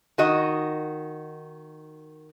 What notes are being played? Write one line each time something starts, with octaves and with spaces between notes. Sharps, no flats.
D#3 F#4 D#5